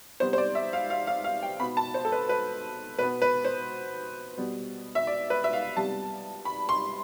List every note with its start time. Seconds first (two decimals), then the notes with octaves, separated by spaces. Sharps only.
0.20 C3 G3 B3 C5
0.33 C5
0.38 D5
0.55 E5
0.73 F5
0.90 F5
1.07 F5
1.24 F5
1.43 G5
1.59 B2 B3 B5
1.77 A5
1.94 C5
2.05 A4
2.12 B4
2.29 B4
2.99 B2 B3 B4
3.22 B4
3.45 C5
4.38 B2 G3 B3
4.95 E5
5.07 D5
5.30 B4
5.44 E5
5.53 F5
5.76 C3 G3 B3 A5
6.45 B5
6.69 C6